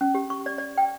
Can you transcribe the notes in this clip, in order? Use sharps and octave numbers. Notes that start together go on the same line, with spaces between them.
C#4
G4
C#6
D5
D5
G5